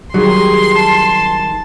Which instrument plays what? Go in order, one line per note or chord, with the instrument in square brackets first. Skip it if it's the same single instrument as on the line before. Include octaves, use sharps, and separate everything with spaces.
[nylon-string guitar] D#3 G3 [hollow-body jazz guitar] F#3 [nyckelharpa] G4 G#4 [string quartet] C6
[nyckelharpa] A5